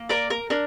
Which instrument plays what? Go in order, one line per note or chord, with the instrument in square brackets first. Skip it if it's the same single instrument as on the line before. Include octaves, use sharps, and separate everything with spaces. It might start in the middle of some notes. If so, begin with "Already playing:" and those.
Already playing: [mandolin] A#3
A#4 D5
A#4
D4 A#4